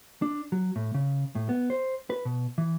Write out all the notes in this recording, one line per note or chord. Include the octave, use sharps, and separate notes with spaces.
D4
F#3
A2
C#3
A2
B3
C5
B4
B2
E3